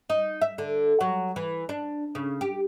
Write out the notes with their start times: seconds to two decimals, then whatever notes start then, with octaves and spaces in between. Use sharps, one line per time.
0.10 D#4
0.41 E5
0.58 D3
1.01 F#3
1.36 E3
1.69 D4
2.15 C#3
2.41 G4